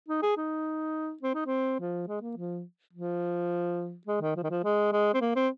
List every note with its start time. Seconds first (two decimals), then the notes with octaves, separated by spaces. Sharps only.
0.09 D#4
0.23 G#4
0.37 D#4
1.23 C4
1.34 D#4
1.46 C4
1.80 F3
2.08 G#3
2.21 A#3
2.37 F3
2.93 F3
4.07 G#3
4.21 D#3
4.36 F3
4.43 D#3
4.50 F3
4.64 G#3
4.92 G#3
5.14 C4
5.21 A#3
5.36 C4